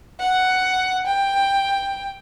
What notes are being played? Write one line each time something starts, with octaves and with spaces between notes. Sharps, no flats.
F#5
G5